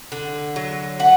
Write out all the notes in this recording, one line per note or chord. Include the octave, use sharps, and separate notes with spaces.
D3
F#3
A3 F#5